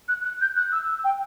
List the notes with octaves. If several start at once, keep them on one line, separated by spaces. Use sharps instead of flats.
F#6
F#6
G6
F#6
E6
E6
G5